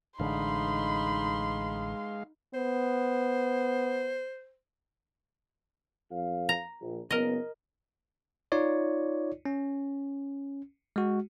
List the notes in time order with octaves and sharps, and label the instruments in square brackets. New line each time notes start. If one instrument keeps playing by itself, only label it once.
[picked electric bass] A1 D3 [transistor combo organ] G#3 F5 [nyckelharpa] D#4 B5 [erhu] C6
[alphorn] B3 [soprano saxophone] C5
[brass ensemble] F2 F5
[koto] A#5
[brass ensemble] A#1
[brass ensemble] F#1 B3 [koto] A#4 D#5
[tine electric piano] D#4 F4 C#5 D5
C#4
G#3 F#4